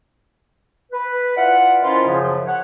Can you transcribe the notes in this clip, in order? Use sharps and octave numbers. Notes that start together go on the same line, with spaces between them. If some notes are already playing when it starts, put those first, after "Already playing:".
B4
E4 F4 B4 D5 F#5
D#3 F3 C#4 E4 F4
F#2 C#3 F3
C#5 F#5